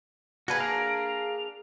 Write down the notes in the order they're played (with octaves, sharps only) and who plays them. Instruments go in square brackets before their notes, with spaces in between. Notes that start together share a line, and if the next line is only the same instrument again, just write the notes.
[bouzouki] A#3 D4 G#4 [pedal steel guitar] F#4 B4 [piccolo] G#6
[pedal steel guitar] F5 A#5 [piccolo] D7
[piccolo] F7